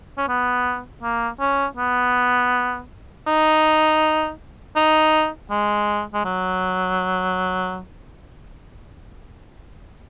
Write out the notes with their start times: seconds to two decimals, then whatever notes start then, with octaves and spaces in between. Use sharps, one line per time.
0.18 C#4
0.28 B3
1.03 A#3
1.40 C#4
1.77 B3
3.27 D#4
4.76 D#4
5.50 G#3
6.13 G#3
6.25 F#3